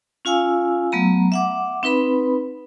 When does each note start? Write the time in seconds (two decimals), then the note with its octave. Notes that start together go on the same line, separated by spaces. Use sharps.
0.25 C#4 F4 F5 G#5 E6
0.92 F#3 A3 B3 A#5
1.32 E5 F#5 D6
1.83 C4 D#4 B4 B5